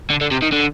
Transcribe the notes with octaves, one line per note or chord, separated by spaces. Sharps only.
D3
D3
C3
D#3
D3